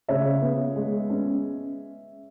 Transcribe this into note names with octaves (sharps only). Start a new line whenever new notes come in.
C#3 C#5 E5
B3
G#3
C#4